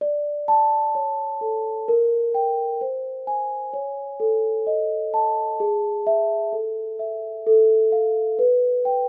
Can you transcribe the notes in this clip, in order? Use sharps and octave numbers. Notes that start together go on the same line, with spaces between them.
D5
A5
C#5
A4
A#4
G5
C5
G#5
C#5
A4
D#5
A5
G#4
E5
A4
E5
A4
F5
B4
G5